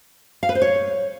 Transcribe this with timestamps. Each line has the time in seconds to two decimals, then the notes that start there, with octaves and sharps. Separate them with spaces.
0.43 F5
0.49 B4
0.55 C5
0.62 C#5